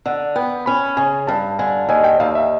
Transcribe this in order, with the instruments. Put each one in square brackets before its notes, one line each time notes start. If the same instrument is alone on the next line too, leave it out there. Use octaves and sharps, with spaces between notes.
[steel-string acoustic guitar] D3 [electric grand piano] F#5
[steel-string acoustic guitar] B3 [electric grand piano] G5
[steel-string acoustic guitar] C#4 [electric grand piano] B5
[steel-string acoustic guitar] C#3 [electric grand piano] G#5
[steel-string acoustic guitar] G2 [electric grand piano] A5
[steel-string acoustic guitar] D3 [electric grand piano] G#5
[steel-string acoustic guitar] D#2 [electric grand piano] G#5
[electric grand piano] G5
[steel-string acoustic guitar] D#2 [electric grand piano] F5
[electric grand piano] E5